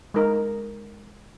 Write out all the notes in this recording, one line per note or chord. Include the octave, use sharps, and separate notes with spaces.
G#3 D#4 A#4